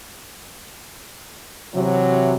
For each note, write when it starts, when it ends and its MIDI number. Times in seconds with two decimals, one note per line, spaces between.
1.74 2.36 48
1.74 2.36 52
1.74 2.36 54